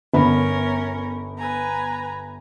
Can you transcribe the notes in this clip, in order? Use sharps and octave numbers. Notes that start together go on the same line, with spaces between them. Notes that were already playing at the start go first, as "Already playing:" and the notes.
G1 B3 C#4 A#4 B5
B4 G#5 A#5